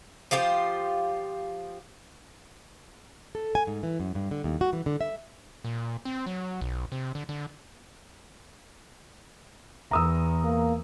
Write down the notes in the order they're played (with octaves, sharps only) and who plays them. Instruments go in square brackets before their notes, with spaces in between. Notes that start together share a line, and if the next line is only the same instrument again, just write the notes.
[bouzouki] F3 F4 G4 C5
[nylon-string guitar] A4
G#5
G#2
E3
F#2
G2
D3
D#2
F#4
E3
D3
E5
[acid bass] A#2
C4
F#3
B1
C3
D3
D3
[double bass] E2 [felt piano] A#5 D#6 E6
[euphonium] A#3